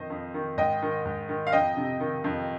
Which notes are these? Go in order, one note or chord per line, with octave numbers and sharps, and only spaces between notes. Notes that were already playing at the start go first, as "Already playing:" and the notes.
Already playing: F2 D#3 C5 D#5
F2
D#3
G#2 D#5 G5
D#3
G#2
D#3
F5
F2 D#5 G5
C3
D#3
F2